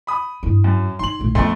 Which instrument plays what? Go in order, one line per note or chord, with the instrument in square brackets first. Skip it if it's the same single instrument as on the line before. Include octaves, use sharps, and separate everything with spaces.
[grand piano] B5 D#6
[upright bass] G2 E4
[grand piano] F#2
[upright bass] D#4 [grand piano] C6 F#7
[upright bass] B1 A2
[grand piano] F2 A3 C6 [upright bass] B3 C#4